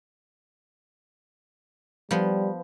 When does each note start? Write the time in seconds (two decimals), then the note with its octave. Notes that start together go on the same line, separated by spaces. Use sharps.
2.11 F3 G3 B3